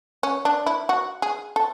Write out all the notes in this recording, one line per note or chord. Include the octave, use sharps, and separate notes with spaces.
C#4
D4
E4
F#4
G#4
A4